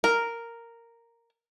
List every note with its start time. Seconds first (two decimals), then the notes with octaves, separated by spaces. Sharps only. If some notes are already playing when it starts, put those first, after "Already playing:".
0.04 A#4